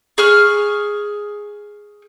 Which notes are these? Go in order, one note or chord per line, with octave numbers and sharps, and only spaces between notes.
G#4 C#6 F6